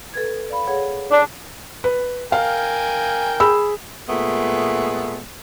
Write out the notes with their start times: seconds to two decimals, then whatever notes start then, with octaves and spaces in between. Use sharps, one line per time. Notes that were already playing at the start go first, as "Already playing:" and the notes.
0.14 A4 B4 G#6
0.50 D5 F5 B5
0.67 G#4 C#5 F#5
1.11 D4
1.84 B4
2.32 A#4 F5 G5 G#5
3.40 G#4 B5 E6
4.09 A#2 G#3 A3 B3